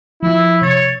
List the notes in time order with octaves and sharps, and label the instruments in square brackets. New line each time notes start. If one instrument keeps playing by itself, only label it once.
[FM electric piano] F3 [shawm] E4
[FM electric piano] C3 A6 [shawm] C#5